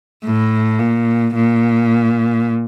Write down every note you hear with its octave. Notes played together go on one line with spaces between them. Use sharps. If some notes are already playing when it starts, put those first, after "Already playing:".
A2
A#2
A#2